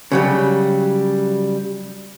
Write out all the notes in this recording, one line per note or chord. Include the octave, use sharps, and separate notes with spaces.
C#3 F#3 G3